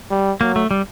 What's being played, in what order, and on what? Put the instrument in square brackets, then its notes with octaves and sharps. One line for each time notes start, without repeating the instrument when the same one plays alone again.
[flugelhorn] G3
[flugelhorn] F#3 [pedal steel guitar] A#3
[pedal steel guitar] A3
G3